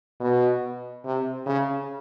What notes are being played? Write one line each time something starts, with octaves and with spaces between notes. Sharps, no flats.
B2
C3
C#3